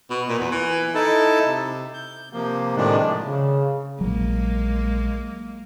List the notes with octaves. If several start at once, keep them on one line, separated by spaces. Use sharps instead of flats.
B2
A#2
E2
E3
D#4 E4 A4 A5
C3
G6
C3 F3 A#3
A2 C3 D#3 F3 G#3 D4
C#3
A#1 F#3 G#3 A#3